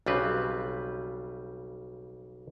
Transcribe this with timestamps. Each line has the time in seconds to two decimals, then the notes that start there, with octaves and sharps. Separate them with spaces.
0.06 B1 C#3 G3 C4 B4